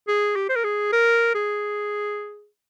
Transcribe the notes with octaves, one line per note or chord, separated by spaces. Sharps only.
G#4
G4
C5
A#4
G#4
A#4
G#4